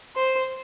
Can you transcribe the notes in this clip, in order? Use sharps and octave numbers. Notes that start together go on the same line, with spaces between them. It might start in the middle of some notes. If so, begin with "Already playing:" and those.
C5